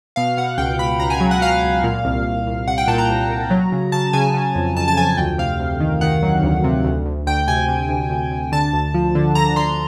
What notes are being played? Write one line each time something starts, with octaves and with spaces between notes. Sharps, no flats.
B2 F5
B2 F#5
C#2 G5
B2 B5
C#2 A#5
G#5
F#3
F#5
F#3 F5
C#2
A#2
C2
C2
C2
C2 F#5
G5
A#2 A5
A#5
C2
C2
F#3
C#3
C#3 A5
C#3 G#5
C#3
F2
F2 A5
A5
F2 G#5
D2 G5
C3 F5
D2
D#3
D#3 F#5
F#3
D2
C3
D2
D2
D2 G5
C3 G#5
C3
D2
D2
D2
D3 A5
D2
F3
D3
D3 A#5
D3 C6